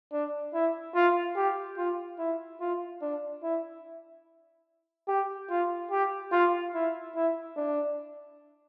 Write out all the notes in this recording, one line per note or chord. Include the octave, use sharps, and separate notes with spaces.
D4
E4
F4
G4
F4
E4
F4
D4
E4
G4
F4
G4
F4
E4
E4
D4